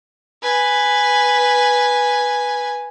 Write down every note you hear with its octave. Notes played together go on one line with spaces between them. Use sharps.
B4 G#5